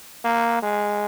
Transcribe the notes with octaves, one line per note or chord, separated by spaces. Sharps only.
A#3
G#3